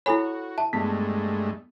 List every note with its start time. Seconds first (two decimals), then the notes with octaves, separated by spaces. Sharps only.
0.06 E4 F#4 A4 C#5 G#5 B5
0.58 E5 A5
0.73 G2 G#3 A3 B3